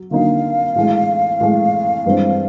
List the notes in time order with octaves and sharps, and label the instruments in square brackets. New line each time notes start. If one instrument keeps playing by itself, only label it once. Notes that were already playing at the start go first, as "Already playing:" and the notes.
Already playing: [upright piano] F#3
[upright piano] D3 F#3 A#3 D#4 [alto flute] F5
[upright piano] A2 E3 G#3
A2 E3 G#3
G2 E3 G#3 C4